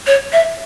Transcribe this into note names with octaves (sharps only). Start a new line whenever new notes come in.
C#5
E5